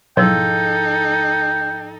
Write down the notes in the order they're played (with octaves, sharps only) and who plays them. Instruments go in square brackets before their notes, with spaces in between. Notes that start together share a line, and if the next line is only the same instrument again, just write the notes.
[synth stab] B1 [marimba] G#2 F3 E4 [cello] D#4 A4 [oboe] G5